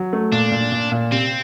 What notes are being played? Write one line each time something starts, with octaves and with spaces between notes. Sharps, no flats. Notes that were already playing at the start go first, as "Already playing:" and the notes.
Already playing: F#3
A3
A#2 D4
A#2
A#2
A#2
C3 C4